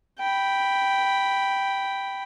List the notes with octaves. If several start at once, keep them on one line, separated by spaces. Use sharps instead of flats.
G5 B5